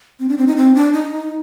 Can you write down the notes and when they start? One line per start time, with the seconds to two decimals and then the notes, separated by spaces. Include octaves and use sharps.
0.20 C4
0.29 D4
0.38 C4
0.47 D#4
0.57 C4
0.75 D4
0.93 D#4